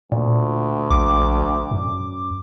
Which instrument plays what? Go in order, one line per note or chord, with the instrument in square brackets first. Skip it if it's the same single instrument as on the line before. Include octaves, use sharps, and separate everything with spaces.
[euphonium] D2 [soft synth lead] A#2
[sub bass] A#1 [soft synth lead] D6
[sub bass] F#2